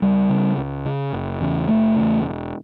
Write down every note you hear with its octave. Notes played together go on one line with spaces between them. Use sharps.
C#2 G3
C#3
C#2
C#3
F#1
E2 C#3
F#1 A3
E2 C#3
E1